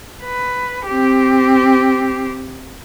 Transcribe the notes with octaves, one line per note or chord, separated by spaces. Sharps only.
B4
C4 G4